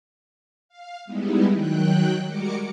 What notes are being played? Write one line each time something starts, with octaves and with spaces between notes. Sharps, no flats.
F5
G3 G#3 B3 D#4 E4
D#3 F#3 G5 F#6
G3 G#3 F#4 A#4 D6 C#7